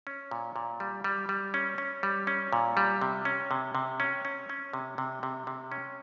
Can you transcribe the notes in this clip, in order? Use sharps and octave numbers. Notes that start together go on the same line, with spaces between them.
C#4
A#2
A#2
G3
G3
G3
C#4
C#4
G3
C#4
A#2
G3
C3
C#4
C3
C3
C#4
C#4
C#4
C3
C3
C3
C3
C#4